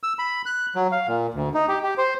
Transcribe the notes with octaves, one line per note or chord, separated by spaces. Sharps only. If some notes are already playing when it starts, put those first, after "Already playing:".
E6
B5
F#6
F#3
F5
A#2
D2
D#4
G4
G4
C5